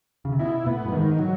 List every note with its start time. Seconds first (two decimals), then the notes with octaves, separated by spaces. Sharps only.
0.25 C#3
0.32 C3
0.39 B2 E4
0.66 A2 B3
0.86 G2
0.92 G#2 D#3
1.19 F#3